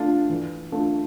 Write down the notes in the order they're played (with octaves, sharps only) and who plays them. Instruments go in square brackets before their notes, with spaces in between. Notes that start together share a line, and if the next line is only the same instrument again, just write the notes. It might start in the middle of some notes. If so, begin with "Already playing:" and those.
Already playing: [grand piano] A3 D4 F4
E3
A3 D4 F4